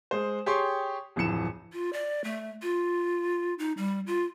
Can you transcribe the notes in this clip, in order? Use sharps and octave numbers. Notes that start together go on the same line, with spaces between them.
G#3 C5
G4 G#4 C#5 G5 C6 C#6
D1 F2 E3 C#7 E7
F4
D5
A3
F4
D#4
G3
F4